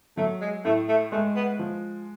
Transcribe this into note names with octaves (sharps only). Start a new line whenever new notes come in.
F#3 A3
G#3
A2 A3
A3
G#3 A3
B3
F3